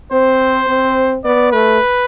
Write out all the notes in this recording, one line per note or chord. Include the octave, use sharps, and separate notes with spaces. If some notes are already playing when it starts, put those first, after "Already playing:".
C4 C5
C4
B3 D5
A3 B4